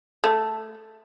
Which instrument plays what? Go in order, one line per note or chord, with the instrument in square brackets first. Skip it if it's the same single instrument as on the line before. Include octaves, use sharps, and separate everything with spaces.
[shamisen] A3